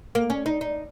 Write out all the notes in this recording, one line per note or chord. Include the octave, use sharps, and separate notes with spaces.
A#3
C#4
D#4
D#4